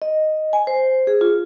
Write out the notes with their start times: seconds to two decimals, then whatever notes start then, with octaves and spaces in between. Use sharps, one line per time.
0.02 D#5
0.53 G#5
0.67 C5
1.07 G#4
1.21 F4